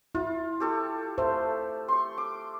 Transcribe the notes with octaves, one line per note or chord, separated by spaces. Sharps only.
E4 F4
G4 A4 C#6
A3 C5
C6 C#6
D6